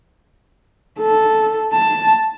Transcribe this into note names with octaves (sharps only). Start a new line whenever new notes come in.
A4
A5